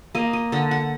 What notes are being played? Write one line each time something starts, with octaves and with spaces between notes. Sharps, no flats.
A#3 D#5
D#5
D3 F#5
F#5